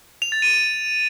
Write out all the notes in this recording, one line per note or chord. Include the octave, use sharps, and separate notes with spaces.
F7
A6
D#7